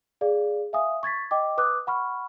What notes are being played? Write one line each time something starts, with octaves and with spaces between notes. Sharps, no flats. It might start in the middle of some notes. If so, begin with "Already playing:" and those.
G#4 D5 F5
E5 F5 G#5 D#6
C#6 G#6 A6 B6
D#5 G5 D6
B4 D6 D#6 F#6
F#5 B5 C#6 F6